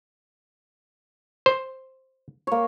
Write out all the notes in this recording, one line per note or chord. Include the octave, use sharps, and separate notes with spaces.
C5
A#3 C#5